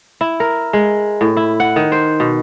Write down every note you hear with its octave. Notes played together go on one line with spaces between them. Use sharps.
E4
A#4
G#3
A2
E4
F#5
D#3
C5
B2